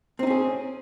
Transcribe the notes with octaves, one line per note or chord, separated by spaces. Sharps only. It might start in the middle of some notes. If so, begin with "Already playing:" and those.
C4 C#4 D#4 G#4